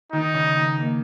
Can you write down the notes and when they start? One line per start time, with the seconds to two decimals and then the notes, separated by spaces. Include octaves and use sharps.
0.12 D#3 D#4
0.34 C#3
0.57 D#3
0.79 A#3